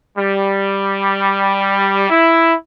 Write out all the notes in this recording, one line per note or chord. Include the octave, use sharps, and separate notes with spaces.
G3
E4